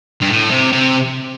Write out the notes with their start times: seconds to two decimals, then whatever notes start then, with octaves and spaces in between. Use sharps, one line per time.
0.21 G2
0.29 A2
0.51 C3
0.73 C3